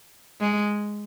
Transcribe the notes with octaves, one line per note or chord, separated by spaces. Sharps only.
G#3